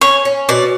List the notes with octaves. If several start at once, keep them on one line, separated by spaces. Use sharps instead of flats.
C#4 C#5
C#4
B2 D5